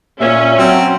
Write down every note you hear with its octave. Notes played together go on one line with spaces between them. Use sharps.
A#2 C#4 E5
F#3 C4